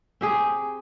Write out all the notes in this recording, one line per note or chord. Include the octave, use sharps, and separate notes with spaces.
C4 G4 G#4